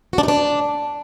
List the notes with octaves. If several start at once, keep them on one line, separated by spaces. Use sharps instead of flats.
F#4
D4
D#4
D4